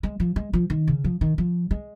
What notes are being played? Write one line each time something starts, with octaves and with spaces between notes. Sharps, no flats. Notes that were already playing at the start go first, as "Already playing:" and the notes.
G#3
F3
G#3
F3
D#3
C#3
F3
D#3
F3
G#3